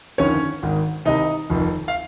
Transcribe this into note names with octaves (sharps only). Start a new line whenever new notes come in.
G1 F2 D#3 C#4 C#5
G#1 G#2 D#3
C2 C3 D#3 D#4 D#5
F1 F2 D#3
F5